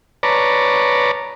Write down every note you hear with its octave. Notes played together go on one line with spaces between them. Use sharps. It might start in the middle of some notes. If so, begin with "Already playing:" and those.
B4 C#5 D5 A5 A#5